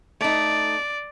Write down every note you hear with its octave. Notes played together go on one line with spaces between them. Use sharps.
A3 D#4 D5